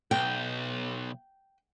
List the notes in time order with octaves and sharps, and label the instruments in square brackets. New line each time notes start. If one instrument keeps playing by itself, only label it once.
[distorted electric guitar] B1 [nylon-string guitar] G5